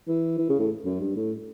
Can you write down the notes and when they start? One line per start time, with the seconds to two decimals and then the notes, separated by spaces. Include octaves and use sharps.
0.08 E3
0.38 E3
0.49 C#3
0.59 A2
0.85 F#2
1.00 G2
1.16 A2